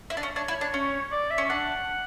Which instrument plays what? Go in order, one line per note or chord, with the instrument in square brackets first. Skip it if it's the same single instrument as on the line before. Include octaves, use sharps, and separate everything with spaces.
[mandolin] E4
D4
C#4
[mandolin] D4 [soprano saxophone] C#5
[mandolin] E4
D4
C#4
[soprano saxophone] D5
E5
[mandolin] C#4
[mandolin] D4 [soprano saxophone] F#5